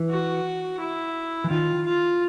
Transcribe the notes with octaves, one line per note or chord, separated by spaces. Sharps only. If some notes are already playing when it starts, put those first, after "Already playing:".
Already playing: E3
F#4
E4
E3
D#3 F4
F4